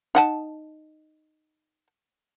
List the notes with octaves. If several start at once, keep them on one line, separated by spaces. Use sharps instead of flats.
D#4 F#5 A5